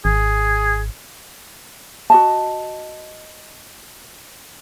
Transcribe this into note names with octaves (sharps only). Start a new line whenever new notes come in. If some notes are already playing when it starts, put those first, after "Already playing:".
G#1 G#4
F#4 D#5 A5